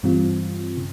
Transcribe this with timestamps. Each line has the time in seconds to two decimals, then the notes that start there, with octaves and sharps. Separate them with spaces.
0.03 G2 E3 G3 C4 F4
0.77 C#3